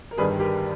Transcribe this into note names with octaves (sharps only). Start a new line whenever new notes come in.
A#4
G1 G2 D#3 G3 G#4 B4
G4 A#4